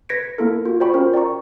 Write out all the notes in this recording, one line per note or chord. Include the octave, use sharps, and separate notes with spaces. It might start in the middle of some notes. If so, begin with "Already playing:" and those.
B4 G#6 A#6 B6 C#7 D7
A#3 E4 A4 A#4
F4 F#4
C5 D5 G5 B5 C#6
C#4 F4 A#4 C5
D5 G5 A#5 C#6